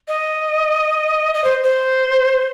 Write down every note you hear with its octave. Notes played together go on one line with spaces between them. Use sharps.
D#5
D#5
C5
C5